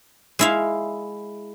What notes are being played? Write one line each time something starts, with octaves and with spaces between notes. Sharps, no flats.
G#3 E4 F5